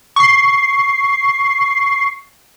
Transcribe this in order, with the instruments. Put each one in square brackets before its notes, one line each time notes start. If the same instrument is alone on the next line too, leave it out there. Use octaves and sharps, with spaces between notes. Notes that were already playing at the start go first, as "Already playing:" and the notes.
[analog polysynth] C#6 C7